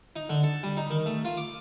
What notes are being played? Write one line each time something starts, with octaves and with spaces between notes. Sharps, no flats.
D#4
D3
A4
G3
D#4
D#3
A3
F4
D6